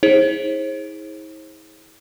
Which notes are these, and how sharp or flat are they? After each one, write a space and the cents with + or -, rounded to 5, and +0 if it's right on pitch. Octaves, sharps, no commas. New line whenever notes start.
E4 -45 G#4 +0 C5 +40